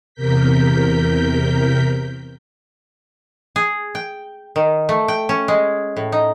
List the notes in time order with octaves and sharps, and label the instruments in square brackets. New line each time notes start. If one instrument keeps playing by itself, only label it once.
[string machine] E2 C3 A#4 G6 B6
[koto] G#4
G5
D#3
A3
G5
C#4
G#3
A2
D#4